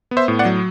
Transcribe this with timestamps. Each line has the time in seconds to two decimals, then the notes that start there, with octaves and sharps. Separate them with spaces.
0.11 B3
0.17 C5 E5
0.28 A2
0.39 D5 F#5
0.45 F#3